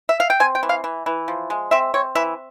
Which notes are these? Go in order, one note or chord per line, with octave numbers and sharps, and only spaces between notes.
E5
F5
G5
C4 G#5
G5
E3
F5
E3
E3
F3
G#3
C4 E5
C4 C#5
E3 E5